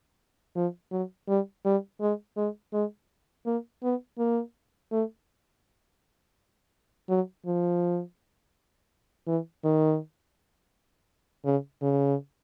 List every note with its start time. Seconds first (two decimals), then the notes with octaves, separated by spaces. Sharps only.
0.56 F3
0.92 F#3
1.28 G3
1.65 G3
2.01 G#3
2.37 G#3
2.73 G#3
3.46 A#3
3.83 B3
4.19 A#3
4.92 A3
7.09 F#3
7.46 F3
9.27 E3
9.64 D#3
11.46 C#3
11.82 C#3